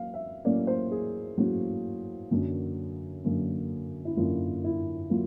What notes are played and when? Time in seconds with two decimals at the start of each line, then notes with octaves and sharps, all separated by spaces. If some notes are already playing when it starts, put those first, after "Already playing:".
Already playing: F#3 A#3 F5
0.14 E5
0.45 A2 F#3 A#3 C#4 D5
0.67 C5
0.91 G#4
1.38 A2 F#3 A#3 C#4 F#4
2.31 F#2 D3 F#3 A#3
3.24 F#2 D3 F#3 A#3
4.05 E4
4.17 F#2 D3 F#3 A#3 F4
4.64 E4
5.10 F#3 A#3 F4